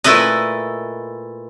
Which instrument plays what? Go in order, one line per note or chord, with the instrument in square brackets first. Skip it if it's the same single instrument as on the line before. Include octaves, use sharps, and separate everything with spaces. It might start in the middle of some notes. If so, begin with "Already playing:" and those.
[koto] A#2 A3 E4 B4 D#5